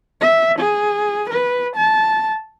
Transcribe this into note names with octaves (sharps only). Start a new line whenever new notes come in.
E5
G#4
B4
A5